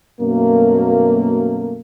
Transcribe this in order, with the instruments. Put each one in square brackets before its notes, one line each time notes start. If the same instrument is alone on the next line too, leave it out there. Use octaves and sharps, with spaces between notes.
[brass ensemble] F#2 B2 A3 A#3